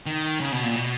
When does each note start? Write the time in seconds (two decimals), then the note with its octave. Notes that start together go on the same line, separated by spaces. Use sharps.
0.06 D#3
0.40 C#3
0.52 B2
0.63 A#2
0.76 B2